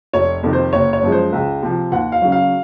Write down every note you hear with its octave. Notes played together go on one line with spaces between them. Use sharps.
F1 C#5
F2 C3 D#3
C5
F#1 C#5
C#5
F#2 F3 G#3
C5
C#2
C3 F3
D#2 F#5
F5
C#3 F#3
F5